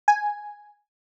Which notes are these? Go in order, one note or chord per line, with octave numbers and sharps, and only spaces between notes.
G#5